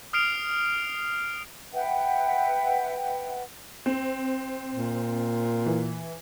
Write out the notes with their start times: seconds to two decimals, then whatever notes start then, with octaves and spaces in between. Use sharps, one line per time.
0.13 D#6 F6 C7 D7 F7
1.73 B4 E5 F#5 G5
3.86 C4
4.74 A#2
5.66 E3